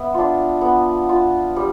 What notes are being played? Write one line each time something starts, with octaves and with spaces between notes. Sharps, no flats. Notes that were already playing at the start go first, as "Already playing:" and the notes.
Already playing: B3 E5
D4 F4
B3
F4
G3